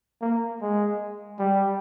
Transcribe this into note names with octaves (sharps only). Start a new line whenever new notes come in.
A#3
G#3
G3